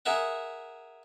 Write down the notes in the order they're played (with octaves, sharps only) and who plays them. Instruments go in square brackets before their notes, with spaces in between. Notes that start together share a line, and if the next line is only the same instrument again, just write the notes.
[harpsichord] G#4 A#4 E5 F#5